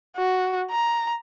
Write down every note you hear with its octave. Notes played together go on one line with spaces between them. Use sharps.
F#4
A#5